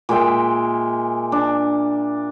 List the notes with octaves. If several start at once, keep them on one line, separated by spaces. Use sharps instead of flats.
A#2 G#3 E5 G5
D4